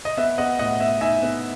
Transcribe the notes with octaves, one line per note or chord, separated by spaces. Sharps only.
D#5
B3 E5
B3 D#5 F#5
A2 D#5 F#5
B3 E5
D#4 E5 G#5
B3